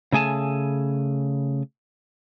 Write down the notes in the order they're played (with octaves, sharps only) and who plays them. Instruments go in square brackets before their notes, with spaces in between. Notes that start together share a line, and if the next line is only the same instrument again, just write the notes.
[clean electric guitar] C#3 A3 G#4 G#5 A5